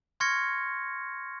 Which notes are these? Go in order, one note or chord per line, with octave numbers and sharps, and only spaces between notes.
C6 C#6 F6 G#6 A#6 C#7